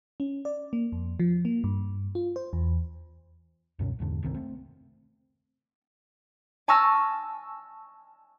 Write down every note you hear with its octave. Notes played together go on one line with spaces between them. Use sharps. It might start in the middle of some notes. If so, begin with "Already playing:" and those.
C#4
D5
A#3
F2
F3
A#3
G2
F4
C5
E2
C#2 F#2 B2 C#4
G#1 E2 G#2 D3
F#1 C2 D#3 C4
A3 C4
G#5 A5 C#6 E6 F6 A#6